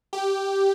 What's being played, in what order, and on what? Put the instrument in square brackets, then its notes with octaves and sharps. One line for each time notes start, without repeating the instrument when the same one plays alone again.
[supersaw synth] G4